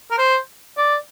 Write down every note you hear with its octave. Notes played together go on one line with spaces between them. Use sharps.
A#4
C5
D5